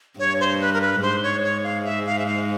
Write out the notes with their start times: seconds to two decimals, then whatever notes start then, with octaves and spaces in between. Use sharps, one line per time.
0.19 G2 C#5
0.40 C5
0.61 B4
0.73 A#4
0.81 B4
1.02 G#2 C5
1.23 C#5
1.43 C#5
1.64 F5
1.85 E5
2.06 F5
2.19 E5
2.26 F5